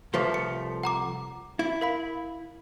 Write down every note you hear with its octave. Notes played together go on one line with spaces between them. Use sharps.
C2 F3 A3 B4
C#7
F#5 A#5 D6
E4
A#4 F5 B5